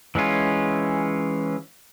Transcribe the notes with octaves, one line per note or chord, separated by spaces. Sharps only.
E3 G#3 C#4 F4